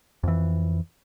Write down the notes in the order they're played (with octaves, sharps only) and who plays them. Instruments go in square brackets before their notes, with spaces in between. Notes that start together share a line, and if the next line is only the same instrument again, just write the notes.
[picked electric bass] F2 E3